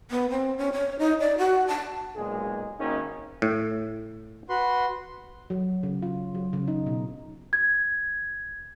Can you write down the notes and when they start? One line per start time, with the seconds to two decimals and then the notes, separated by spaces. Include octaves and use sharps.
0.11 B3
0.30 C4
0.58 C#4
0.73 C#5
0.99 D#4
1.20 D5
1.38 F#4
1.68 A5
2.16 B1 A#2 G#3 G#4
2.79 G#1 A#3 C#4 D#4
3.42 A2
4.49 F#4 B4 C6
5.50 F#3
5.83 C#3
6.02 F4
6.35 F#3
6.53 C#3
6.68 D#4
6.86 B2
7.53 G#6